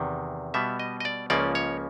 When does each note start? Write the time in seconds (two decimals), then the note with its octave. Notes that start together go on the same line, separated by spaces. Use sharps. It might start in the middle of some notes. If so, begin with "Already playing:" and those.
Already playing: E2 C3 D#3
0.54 B2 G3 B3 E5
0.80 D#5
1.00 D#5
1.05 D5
1.30 C#2 C#3 F3 A#3 C#4 D5
1.55 C#5